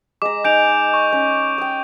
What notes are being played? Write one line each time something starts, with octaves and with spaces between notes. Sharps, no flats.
G#3 A#5 D6
D#4 G#5 G6 D7 F7
C#6
C#4
G5 D#6